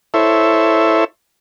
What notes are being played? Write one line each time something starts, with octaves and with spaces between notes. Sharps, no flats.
E4 A4 C5 C#5 E5